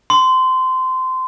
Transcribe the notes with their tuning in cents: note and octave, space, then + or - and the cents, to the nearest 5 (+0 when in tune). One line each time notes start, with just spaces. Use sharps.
C6 -20